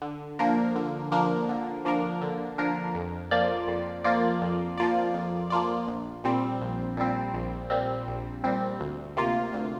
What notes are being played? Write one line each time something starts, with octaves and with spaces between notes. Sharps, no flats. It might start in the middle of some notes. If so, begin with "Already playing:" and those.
D3
F3 A#3 D4 A#4
D3
F3 A#3 D4 A#4
D3
F3 A#3 D4 A#4
D3
F3 A#3 D4 A#4
F2
F3 A#3 F4 D5
F2
F3 A#3 F4 D5
F2
F3 A#3 F4 D5
F2
F3 A#3 F4 D5
A#1
A#2 G3 C4
A#1
A#2 G3 C4
A#1
A#2 G3 C4
A#1
A#2 G3 C4
D2
C3 A#3 F4
D2